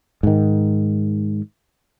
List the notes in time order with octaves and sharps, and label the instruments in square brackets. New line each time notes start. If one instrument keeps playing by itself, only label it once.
[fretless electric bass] G#2 D#3